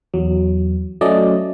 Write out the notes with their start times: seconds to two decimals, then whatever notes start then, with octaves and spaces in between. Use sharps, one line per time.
0.14 E2 F#3
1.01 F#3 A3 C#4 D5 D#5